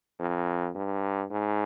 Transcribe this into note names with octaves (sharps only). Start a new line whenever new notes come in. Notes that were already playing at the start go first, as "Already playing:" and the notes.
F2
G2
G#2